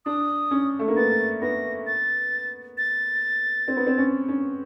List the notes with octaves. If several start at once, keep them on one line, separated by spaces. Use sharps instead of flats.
D4 D#6
C#4
A3
A#3
B3 A6
B3 A#6
A6
A6
C4
B3
C4
C#4
C#4